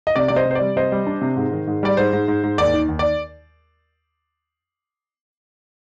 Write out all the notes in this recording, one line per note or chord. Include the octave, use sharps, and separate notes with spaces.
D#5
C3 D5
C3 D5
C5 D#5
C3
C5
D5
G3
C3 C5 D#5
G3
D4
C3
G#2
D#3
G#2
G3 D5
G#2 C5
G#2
G#2
G#2
D#2 D5
D#3
D#2
D5